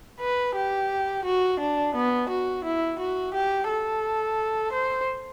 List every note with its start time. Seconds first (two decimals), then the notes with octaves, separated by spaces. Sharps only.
0.21 B4
0.56 G4
1.25 F#4
1.60 D4
1.95 B3
2.29 F#4
2.65 E4
2.99 F#4
3.34 G4
3.69 A4
4.73 C5